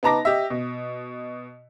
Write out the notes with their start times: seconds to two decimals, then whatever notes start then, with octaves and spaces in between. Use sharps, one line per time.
0.03 B3 D#4 A5 A#5 D6 A#6
0.25 G4 D#5 E5
0.50 B2